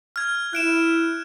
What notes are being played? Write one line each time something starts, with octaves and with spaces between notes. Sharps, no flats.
F6 G#6
E4 F#6 D7 E7